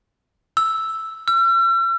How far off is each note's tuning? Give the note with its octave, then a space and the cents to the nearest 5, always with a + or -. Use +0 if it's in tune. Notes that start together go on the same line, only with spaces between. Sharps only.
E6 -5
E6 +45